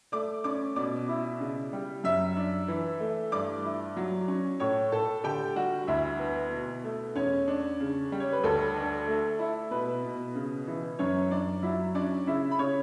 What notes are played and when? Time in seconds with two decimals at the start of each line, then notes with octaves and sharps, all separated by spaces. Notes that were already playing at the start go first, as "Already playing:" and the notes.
0.12 A3 D5 D6
0.44 C#4 D5 D6
0.76 B2 D5 D6
1.08 E4
1.40 C#3
1.73 G3
2.04 F#2 E5 E6
2.37 D4
2.68 E3
3.00 A3
3.32 G2 D5 D6
3.64 E4
3.97 F#3
4.28 C#4
4.60 A2 C#5 C#6
4.92 A2 A4 A5
5.24 D3 G4 G5
5.56 G3 F#4 F#5
5.87 D2 E4 E5
6.19 B3
6.52 B2
6.84 A3
7.16 E2 C#4 C#5
7.48 D4
7.80 C#3
8.12 G3
8.20 C#5
8.33 B4
8.43 D2 A4
8.76 D4
9.08 A3
9.39 E4
9.71 B2 B4
10.04 B2
10.35 C#3
10.67 E3
10.99 F#2 C#4 C#5
11.31 F#2 D4 D5
11.63 F#3 E4 E5
11.95 C#4 D4 D5
12.27 C#3 E4 E5
12.51 B5
12.59 C#3 C#5 C#6